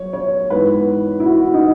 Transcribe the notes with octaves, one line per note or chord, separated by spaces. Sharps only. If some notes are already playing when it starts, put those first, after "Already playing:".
Already playing: F#3 C#5
C#5
G#2 E3 B3 B4
E4
F#4
D#4